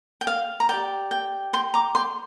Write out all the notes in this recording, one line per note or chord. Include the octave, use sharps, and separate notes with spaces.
G5
F5
A#5
G4 D5 G5
G5
G5 C6
A#5 D6
G5 C6